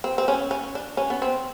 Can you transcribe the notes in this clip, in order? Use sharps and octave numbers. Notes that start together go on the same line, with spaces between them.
C4
C4
C#4
C#4
D4
C#4
B3
C4